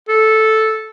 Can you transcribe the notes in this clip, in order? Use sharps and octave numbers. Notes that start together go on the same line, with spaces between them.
A4